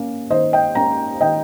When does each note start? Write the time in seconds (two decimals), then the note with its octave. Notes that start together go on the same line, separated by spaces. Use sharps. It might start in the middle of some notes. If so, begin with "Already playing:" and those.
Already playing: A#3 C#4
0.30 D#3 C5 D#5
0.53 D#5 G5
0.75 A#3 C#4 G5 A#5
1.21 D#3 D#5 G5